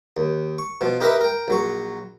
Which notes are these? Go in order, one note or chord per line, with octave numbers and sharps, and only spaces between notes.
D#2
C#6
B2 F3
D#4 G4 A#4 B4 D#5 E5
A#4 G5
A#1 F#3 C#6